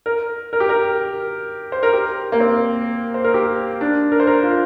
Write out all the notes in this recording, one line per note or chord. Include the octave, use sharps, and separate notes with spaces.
A#4
A#4
G4
A#4
C5
A#4
G4
A#3
C4
C5
A#4
G4
D4
A#4
C5
A#4
F4